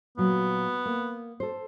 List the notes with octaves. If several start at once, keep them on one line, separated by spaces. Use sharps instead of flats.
A#2 F#3 B3
A#3
A4 C5